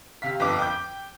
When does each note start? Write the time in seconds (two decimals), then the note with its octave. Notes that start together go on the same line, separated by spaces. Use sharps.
0.22 C3 F5 B6
0.40 G1 F2 D6
0.59 G5 D6 G6